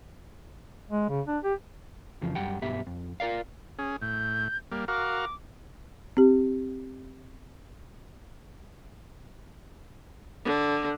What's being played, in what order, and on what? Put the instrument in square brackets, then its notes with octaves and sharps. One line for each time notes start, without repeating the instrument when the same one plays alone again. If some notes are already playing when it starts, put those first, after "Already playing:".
[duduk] G#3
C#3
D4
G4
[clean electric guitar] F2 C#3 E3 F3
F#2 G3 F#5 G5
B1 G2 B3 G4 E5
F2
F4 A#4 D5 F5
[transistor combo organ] C#4 G#4
[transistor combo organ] A2 [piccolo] G6
[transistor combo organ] G3 A#3
[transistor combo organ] F#4 A#4 F5 [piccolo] D6
[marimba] C4 G4
[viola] D3